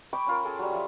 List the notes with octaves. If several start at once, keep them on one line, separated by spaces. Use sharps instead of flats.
G5 B5 C#6 D6
C#4 F4 A#4
G#4 A4
F#3 G3
F3 E5